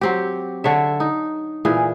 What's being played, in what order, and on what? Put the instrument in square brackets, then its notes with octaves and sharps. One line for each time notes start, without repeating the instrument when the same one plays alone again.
[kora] F#3 C4 G4
D3 C#5 E5
D#4
A#2 E3 G#4